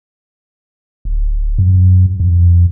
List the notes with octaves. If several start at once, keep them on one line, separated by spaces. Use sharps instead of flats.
D1
F#2
F2